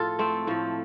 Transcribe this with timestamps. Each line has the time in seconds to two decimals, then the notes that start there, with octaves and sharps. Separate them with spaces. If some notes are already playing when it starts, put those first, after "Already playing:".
Already playing: A2 F3 F4 A4
0.19 A3 C4
0.47 A2 F3 A3